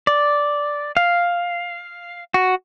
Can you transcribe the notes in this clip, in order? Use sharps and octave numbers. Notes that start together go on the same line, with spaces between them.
D5
F5
F#4